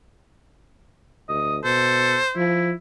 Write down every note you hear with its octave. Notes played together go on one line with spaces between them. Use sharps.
D2 D#5
B2 A4 C5
F3 E4